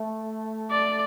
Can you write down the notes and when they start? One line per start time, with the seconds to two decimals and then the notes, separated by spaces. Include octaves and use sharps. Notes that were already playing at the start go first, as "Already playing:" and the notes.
Already playing: A3
0.71 D5